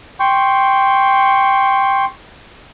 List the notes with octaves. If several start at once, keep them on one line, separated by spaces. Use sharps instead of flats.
G5 C6 C#6